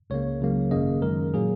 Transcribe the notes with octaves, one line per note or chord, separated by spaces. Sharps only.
C#2 C#3 A#3 C#5
C#2 C#3 F#3 A#3
G#1 F#2 C#3 A#3 D#5
F#2 D#3 G#3 A#4
A#2 F#3 A#3 G#4